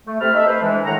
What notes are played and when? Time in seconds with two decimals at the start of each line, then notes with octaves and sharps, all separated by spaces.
0.06 A3
0.20 C3 A3 C4 A4 B5 F6
0.34 D#4 A4 C5 E5
0.46 B4 C5
0.61 E3 G#3 D4
0.85 A2 D#3 F#5 A#5